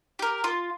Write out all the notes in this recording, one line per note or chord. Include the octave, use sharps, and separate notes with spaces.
G4 A#4
F4